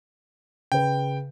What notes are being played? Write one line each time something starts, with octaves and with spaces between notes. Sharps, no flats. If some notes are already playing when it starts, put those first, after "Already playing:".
C#3 B4 G5